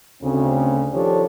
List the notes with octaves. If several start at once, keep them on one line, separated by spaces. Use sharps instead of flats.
D2 C#3 C4
D#3 F3 D4 G4 A4 C#5